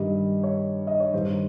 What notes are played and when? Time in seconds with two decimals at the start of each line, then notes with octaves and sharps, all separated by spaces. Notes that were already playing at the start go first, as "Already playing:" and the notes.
Already playing: G2 D#3 G3 D#5
0.43 C#5
0.87 D#5
1.00 C#5
1.13 G2 D#3 G3 C5